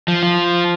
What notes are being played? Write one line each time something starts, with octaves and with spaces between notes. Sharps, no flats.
F3
F4